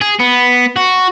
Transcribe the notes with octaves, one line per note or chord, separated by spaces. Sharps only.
G#4
B3
F#4